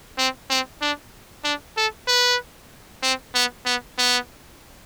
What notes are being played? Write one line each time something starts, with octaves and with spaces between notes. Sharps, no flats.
C4
C4
D4
D4
A4
B4
C4
B3
B3
B3